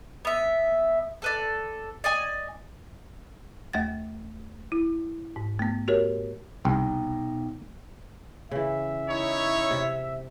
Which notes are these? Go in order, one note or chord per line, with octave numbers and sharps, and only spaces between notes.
B3 E5
A4 B4 D5
D5 D#5 G#5
D#2 A3 F#5 A6
E4
G#2
A3 B3
F#4 G4 A#4 C#5
C2 B2 D#4 G5
C#3 E3 E5
D#4 E4 C#5
C3